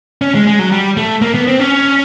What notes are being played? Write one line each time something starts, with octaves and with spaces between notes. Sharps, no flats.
C#4
G#3
G#3
F#3
G3
A3
A#3
B3
C4
C#4